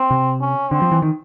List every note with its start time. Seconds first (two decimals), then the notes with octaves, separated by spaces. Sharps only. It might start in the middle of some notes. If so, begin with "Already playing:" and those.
Already playing: C4
0.11 C3
0.41 C#4
0.71 D3 C4
0.82 F3
0.92 E3
1.02 D#3